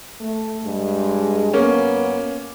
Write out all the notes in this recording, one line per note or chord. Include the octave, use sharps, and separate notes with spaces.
A3
G2 G#3
F#2 A#3 B3 C#4